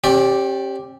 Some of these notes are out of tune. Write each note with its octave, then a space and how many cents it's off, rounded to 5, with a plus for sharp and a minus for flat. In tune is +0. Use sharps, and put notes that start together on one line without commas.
C#4 -45 G4 +0 D5 +0